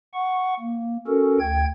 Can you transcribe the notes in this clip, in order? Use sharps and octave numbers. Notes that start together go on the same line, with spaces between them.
F#5 C#6
A#3
C#4 F#4 A4 A#4
D2 G5 G#6